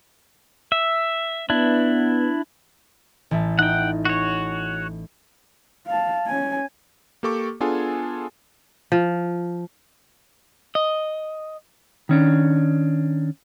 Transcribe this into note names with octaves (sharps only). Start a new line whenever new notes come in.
E5
B3 D4 E4
A1 E5 A5
D#4 F#5 G5
F#4 C#5
F5 A5
C#4 G#5
A#3 G4 A4 C#6 D6
B3 D4 F4 G#4 A4 G#5
F3
D#5
D#3 C#4 D4